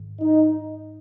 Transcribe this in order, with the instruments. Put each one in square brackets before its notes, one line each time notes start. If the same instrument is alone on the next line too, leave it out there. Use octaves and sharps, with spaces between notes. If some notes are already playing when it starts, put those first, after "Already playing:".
Already playing: [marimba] G#2 D#3
[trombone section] D#4